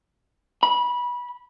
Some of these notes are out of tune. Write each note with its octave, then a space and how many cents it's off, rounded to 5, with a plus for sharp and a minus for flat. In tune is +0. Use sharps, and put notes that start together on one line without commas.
B5 -20